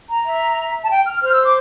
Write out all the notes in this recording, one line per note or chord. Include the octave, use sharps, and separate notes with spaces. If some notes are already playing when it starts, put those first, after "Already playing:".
A#5
E5
A5
G5
F6
C5 F6
E6
D6